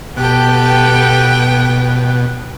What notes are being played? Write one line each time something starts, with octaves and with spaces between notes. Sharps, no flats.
B2 B3 G4 A4 G5 F#6